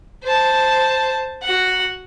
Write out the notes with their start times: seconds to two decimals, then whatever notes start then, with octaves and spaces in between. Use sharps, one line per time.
0.24 C5 A5
1.42 F#4 F#5